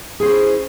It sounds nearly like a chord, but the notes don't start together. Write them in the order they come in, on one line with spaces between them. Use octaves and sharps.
G#4 C5 C#4 E4